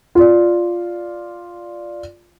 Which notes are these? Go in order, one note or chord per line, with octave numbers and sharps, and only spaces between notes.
F4 D5